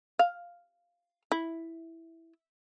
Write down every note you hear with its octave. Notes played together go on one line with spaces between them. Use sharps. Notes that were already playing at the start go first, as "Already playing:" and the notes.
F5
E4